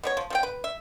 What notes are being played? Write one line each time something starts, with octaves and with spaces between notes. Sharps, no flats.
B2 D#4 C#5
F3
F3 A4 G5
B4
E5